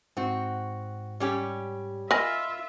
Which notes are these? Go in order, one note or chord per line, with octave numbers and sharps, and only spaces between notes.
G#2 C4 F#4
G3 C#4 G4
F4 A#4 D#5 E5 G#5 B5 E6 F6